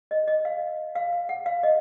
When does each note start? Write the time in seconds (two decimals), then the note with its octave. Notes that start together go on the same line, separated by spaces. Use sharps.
0.11 D#5
0.28 D#5
0.45 F5
0.95 F5
1.13 F5
1.29 F#5
1.46 F5
1.63 D#5